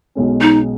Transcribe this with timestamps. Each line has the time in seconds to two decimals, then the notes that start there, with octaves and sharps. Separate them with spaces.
0.15 B1 B2 G#3 C#4
0.41 D#4